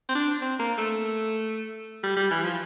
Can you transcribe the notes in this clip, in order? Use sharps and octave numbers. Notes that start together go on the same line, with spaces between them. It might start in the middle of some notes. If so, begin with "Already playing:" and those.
C4
D4
C4
A#3
A3
G3
G3
E3
F3